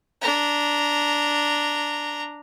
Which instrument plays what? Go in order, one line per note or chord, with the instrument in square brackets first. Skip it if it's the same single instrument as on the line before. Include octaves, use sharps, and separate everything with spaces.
[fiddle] D4 A#5